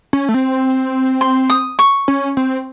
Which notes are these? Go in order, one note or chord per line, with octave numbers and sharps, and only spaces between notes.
C#4
A3
C4
C6
D#6
C#6
C#4
C4